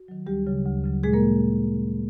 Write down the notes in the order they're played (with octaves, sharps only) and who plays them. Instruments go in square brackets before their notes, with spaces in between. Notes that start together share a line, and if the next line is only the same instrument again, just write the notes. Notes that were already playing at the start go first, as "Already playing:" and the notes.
Already playing: [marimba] F#4
D#3 F#3
D2 G3 G4
C#3 F#3
D2
C#3 F#3
A#2 G#3 G#4
A#3 A#4